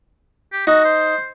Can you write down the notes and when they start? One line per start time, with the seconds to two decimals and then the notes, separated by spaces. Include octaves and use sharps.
0.52 G4
0.67 D#4 F#4
0.85 C5